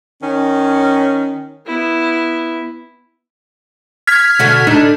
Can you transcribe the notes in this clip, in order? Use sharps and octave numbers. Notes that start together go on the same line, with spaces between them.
D#3 C#4
B3 E4
F6 G#6 B6
B2 D3 F#4
D4 D#4 A4